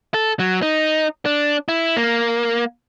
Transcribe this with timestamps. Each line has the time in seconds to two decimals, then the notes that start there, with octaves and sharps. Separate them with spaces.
0.14 A4
0.39 F#3
0.62 D#4
1.25 D4
1.69 E4
1.96 A#3